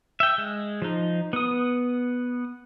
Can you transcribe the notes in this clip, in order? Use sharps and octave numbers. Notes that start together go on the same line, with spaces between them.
E5 G5
G#3
F3 D#4
B3 D#6